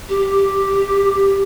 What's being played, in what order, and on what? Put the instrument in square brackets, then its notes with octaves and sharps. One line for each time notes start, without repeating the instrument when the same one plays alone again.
[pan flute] G4